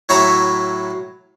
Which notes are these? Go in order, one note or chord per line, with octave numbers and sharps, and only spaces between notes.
A2 F#3 F#4 E5 A#5 B5